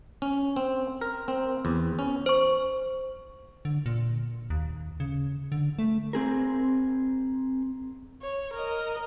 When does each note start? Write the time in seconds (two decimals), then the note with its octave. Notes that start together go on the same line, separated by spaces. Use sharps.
0.22 C#4
0.56 C4
1.01 A#4
1.28 C4
1.65 E2
1.99 C#4
2.26 C5 C#6
3.65 D3
3.86 A#2
4.50 D#2
5.00 C#3
5.52 D3
5.79 A3
6.13 C4 G#4 A#4
8.22 C#5
8.54 A#4 D#5